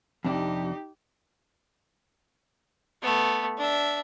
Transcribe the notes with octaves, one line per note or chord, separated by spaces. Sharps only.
F2 C3 D4 D#4 G4
A3 B3
D4 E5